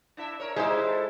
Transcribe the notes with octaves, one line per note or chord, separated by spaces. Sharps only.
D4 E4 E5
A#4 C#5
G#3 D#4 E4 G4 C5
A4